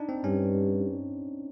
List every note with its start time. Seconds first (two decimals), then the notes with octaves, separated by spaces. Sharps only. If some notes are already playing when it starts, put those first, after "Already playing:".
Already playing: D4 D#4
0.09 C4
0.24 G2 C#4